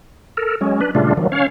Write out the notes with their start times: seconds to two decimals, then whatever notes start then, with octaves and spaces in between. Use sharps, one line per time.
0.37 A4 A#4
0.61 F#3 G#3 C#4
0.81 D4 B4
0.95 A#2 C#3 G3 A3 D4 F4
1.17 D#3 F3 F#3
1.32 C#4 C#5 F5